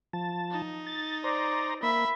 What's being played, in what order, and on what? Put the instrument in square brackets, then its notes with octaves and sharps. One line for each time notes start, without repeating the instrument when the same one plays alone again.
[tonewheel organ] F3 A5
[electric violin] D#4
[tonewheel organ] A6
[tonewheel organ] C5 A#5 [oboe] D5
[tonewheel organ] A#3 [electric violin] E5 [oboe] B5